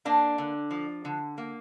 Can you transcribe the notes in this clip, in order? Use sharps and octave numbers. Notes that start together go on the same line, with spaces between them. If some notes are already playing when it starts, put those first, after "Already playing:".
A#3 D4
D3
F3
D3
A#3